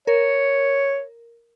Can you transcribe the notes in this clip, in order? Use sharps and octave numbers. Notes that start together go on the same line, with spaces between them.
A#4 C#5